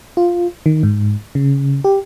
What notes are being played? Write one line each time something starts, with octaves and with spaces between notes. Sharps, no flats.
F4
D#3
G#2
C#3
G4